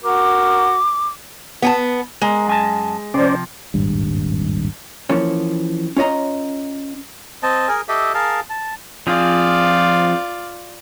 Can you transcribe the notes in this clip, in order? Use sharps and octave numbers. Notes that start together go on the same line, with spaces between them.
F#4 A#4 D6
B3 G#5 A5
G#3 A#4
F#2 G#5 A5
C3 F3 C#4 C5 D5
D#1 G#1 G2
E3 F3 A#3 C#4
C#4 F4 C#5 D#5 A#5
C4 D#5 A5
G#4 A#4 G#5
G4 A4 D#5 E5
G#4 A#4 F5 A5
A5
F3 C4 F4 G#4 D5